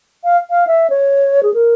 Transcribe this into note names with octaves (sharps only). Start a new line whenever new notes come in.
F5
F5
E5
C#5
G#4
A#4